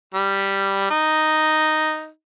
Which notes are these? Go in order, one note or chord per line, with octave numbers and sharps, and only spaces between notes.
G3
D#4